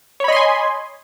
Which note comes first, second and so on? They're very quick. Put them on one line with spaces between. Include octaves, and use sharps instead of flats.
C#5 B5 D#5 C6 G#5